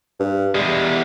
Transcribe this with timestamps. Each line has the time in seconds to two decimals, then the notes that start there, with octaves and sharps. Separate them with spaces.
0.19 G2
0.55 E2 G3 G#3